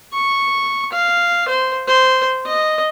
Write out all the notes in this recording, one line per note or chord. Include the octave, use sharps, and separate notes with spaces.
C#6
F5
C5
C5
D#5